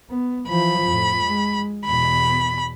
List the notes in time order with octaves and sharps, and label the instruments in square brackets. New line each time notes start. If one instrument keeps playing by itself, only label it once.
[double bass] B3
[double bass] E3 F3 [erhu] B5
[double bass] F2 A2
G#3
[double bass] E2 B2 [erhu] B5